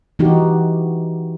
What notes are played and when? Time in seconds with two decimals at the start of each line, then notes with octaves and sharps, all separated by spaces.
0.19 E3 D#4 F#4 G4